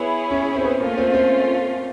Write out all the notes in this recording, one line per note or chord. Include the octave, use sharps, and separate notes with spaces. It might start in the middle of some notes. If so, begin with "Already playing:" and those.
Already playing: B3 E4 G#4 C#5
C#4
C4
B3
A3 A#3 C#4 F4
C4
C4